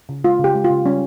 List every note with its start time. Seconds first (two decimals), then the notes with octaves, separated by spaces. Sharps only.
0.09 C#3
0.24 G#3 F4
0.39 C#3 G4
0.55 G#3
0.64 F4
0.70 C#3
0.85 G3 C#4